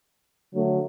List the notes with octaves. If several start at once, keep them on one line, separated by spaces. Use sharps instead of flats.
D3 F#3 A3